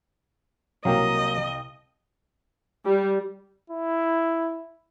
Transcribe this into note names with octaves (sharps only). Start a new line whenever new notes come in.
C2 F#3 A#3 D#5 F5 G5
G3
E4